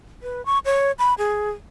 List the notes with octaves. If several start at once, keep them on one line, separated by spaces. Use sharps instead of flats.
B4
C#6
C#5
B5
G#4